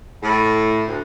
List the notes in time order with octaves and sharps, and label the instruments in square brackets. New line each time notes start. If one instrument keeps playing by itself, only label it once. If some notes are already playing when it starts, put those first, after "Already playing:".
[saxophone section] A2
D2